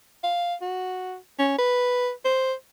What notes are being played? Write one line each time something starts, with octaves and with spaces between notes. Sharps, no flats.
F5
F#4
C#4
B4
C5